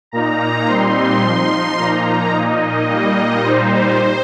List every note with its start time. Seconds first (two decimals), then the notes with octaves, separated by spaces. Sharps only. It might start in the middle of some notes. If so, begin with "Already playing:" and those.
0.12 A#2 A#3 D#4 A#5
0.66 A#2 G3 C4 D#4 C6
1.23 F3 D#4
1.77 A#2 F3 A#3 D#4 A#5
2.32 A#2 A#3 D#4 D#5
2.88 A#2 G3 A#3 D#4
3.42 A#2 G3 D#4 C5